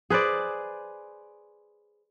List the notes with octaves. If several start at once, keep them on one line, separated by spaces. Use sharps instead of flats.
G#4 B4 C5 D5